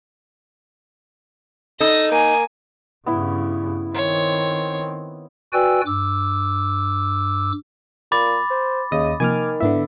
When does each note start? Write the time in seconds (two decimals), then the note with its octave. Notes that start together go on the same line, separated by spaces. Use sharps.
1.80 D#4 A4 A#6
2.12 A#3 G#5
3.06 G2 C#3 B3 E4
3.95 D#3 C4 C#5
5.53 F#4 B4 D5 G5 G#5 E6
5.86 G2 D6 E6
8.12 A#2 B5 D6 A6
8.50 C5
8.92 D#2 C#3 D#5 D#6
9.20 C3 D#3 F3 A#3 G#5 D6 F6
9.60 G#2 D3 B3 E4 E5